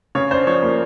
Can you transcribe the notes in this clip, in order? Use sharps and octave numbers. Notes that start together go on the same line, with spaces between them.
C#3 C#5
D4 C5
F3 C#5
A#3